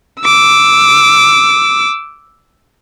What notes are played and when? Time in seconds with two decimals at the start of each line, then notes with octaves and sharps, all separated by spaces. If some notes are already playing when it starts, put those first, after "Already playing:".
0.21 D6 E6